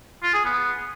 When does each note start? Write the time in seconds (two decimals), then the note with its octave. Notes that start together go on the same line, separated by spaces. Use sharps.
0.23 F4
0.34 G#4
0.44 B3